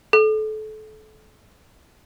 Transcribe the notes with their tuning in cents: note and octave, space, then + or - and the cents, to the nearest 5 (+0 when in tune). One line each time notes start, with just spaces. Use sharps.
A4 -30